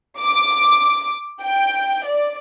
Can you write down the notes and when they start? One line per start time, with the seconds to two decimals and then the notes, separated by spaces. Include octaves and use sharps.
0.19 D6
1.42 G5
2.07 D5